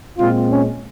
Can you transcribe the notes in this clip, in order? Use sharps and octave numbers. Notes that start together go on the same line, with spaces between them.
A#2 G#3 C4 F4
C#4